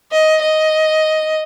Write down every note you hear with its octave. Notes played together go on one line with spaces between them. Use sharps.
D#5
D#5